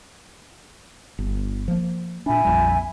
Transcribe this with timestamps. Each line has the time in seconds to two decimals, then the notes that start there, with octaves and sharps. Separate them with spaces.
1.19 G1
1.68 F3 A#3
2.26 A#2 D4 E5 G#5 B5
2.44 A#1 F2 G3